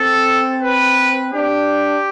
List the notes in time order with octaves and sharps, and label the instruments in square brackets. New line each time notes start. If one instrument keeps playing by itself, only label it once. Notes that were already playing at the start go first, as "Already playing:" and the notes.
Already playing: [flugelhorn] C4 [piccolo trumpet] A4
[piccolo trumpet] B4
[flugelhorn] D4 [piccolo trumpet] G4